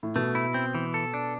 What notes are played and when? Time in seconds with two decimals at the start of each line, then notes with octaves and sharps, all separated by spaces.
0.03 A2
0.16 B2 A3
0.35 E4
0.54 C4
0.75 E3
0.94 A4
1.14 D4